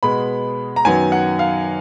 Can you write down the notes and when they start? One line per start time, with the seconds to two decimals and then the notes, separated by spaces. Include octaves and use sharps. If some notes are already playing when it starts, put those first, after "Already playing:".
0.03 B2 G#3 B3 B5
0.76 A#5
0.85 F#2 D#3 F#3 B3 G#5
1.12 F#5
1.39 F5